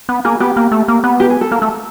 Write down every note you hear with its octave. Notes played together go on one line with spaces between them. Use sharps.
B3
A#3 G#4
B3 G4
A#3
A3
A#3
B3
G4
G#4
A4
A#3
A3